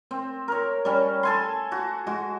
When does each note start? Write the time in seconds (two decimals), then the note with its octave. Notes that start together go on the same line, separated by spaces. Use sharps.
0.11 C4
0.48 A#4 C#5
0.85 G3 C#4
1.23 A4 G#5 C6
1.72 F#4
2.07 G#3 F#4